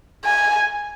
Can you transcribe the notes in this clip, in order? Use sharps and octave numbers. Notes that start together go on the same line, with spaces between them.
G#5